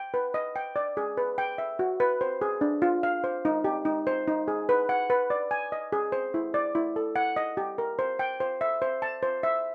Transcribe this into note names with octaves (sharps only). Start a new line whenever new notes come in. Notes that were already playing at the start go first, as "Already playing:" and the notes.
Already playing: G5
B4
D#5
G5
D5
G#4
B4
G5
E5
F#4
B4
C5
G#4
D4
F4
F5
C5
D#4
G4
D#4
C5
D#4
G#4
B4
F#5
B4
D5
G#5
D#5
G#4
C5
E4
D5
E4
A4
F#5
D#5
G4
A#4
C5
G5
C5
E5
C5
A5
C5
E5